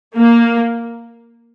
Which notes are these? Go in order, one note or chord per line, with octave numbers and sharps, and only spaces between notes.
A#3